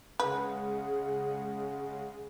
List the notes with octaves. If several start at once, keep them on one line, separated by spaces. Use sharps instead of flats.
C#3 G#3 G#4 B4 F#5